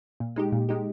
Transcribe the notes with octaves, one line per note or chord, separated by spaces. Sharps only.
A#2
G#3 D#4 G4
A#2
G#3 D#4 G4